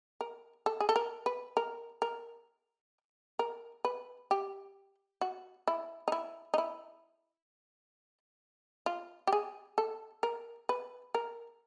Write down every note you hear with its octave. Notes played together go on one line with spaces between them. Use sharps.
A#4
A4
G#4
A4
A#4
B4
A#4
A#4
A#4
B4
G4
F#4
E4
D#4
E4
D#4
E4
F4
G4
G#4
A4
A#4
B4
A#4